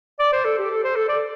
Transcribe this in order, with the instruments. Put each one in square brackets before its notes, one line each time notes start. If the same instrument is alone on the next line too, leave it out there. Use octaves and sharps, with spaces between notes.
[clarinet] D5
C5
A4
G4
A4
C5
A4
D5